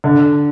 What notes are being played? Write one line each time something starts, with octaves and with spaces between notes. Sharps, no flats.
D3